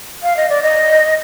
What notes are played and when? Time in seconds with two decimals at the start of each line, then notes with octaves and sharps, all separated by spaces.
0.23 F5
0.37 D#5
0.49 D5
0.63 D#5